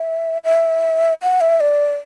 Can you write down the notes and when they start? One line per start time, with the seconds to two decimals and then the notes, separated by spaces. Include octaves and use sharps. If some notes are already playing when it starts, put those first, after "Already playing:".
Already playing: E5
0.44 E5
1.22 F#5
1.41 E5
1.60 D5